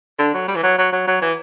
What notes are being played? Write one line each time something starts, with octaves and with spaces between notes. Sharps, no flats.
D3
F#3
G3
E3
F#3
F#3
F#3
F#3
E3